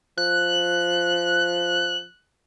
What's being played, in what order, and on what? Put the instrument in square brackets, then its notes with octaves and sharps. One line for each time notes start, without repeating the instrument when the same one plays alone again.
[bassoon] F3 [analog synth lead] F#6